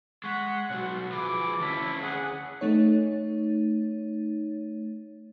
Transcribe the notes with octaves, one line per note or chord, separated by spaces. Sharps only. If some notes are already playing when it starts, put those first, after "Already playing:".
G#3 F#5 C#6 G#6 B6
B2 F#3 F#4 C#5
F3 G#4 B4 D6
D2 C#4 E4 A5 B6
G#4 F#5
A3 D#4 C#5